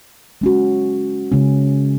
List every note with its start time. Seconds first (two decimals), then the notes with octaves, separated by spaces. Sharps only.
0.41 G#3 C#4 F#4
1.32 C#3 G#3 C#4